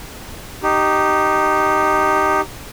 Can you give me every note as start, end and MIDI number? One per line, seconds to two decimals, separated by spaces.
0.63 2.41 63
0.63 2.41 67